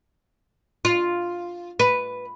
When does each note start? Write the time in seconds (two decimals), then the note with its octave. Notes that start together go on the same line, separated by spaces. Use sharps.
0.85 F4
1.80 B4